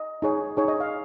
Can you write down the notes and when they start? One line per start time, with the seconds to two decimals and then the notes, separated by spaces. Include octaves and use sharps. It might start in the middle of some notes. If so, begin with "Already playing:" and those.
Already playing: D#5
0.22 D#4 G#4 C#5
0.57 D#4 G#4 C#5
0.68 D#5
0.80 F5